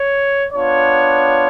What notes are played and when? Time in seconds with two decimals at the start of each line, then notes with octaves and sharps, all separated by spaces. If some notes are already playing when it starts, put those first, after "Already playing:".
Already playing: C#5
0.53 B3 D4 F4 C#5